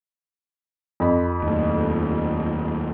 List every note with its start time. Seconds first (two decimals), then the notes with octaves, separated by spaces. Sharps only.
1.00 F2 B5
1.43 D#2 A2